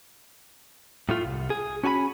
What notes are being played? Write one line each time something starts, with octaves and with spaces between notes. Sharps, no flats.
A2 A3 F4
C2
G#4
C#4 F#4 G#5 A5 B5